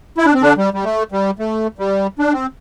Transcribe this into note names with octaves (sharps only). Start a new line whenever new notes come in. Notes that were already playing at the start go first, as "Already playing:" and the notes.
E4
D4
C4
D3 D4
G3
G3
A3
G3
A3
G3
D4
C4